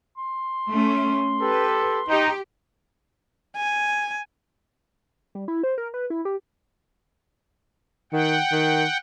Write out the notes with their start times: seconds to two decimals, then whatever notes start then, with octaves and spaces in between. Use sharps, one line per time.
0.17 C6
0.70 A3 C#4
1.41 G4 A4 B4
2.08 D#4 G4
3.57 G#5
5.35 G3
5.48 E4
5.63 C5
5.78 A#4
5.94 B4
6.10 E4
6.25 G4
8.13 D#3 F#5 G5
8.52 D#3